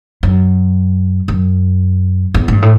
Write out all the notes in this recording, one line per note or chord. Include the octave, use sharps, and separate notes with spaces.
F#2
F#2
E2
A2
G2
A2